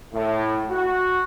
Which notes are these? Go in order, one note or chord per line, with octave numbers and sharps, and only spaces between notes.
A2
F#4